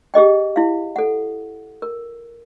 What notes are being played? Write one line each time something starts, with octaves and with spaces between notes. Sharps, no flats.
G4 G#4 D#5 G5
E4 F5
A4 F#5
A#4